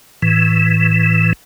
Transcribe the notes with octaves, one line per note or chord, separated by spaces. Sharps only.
A2 E3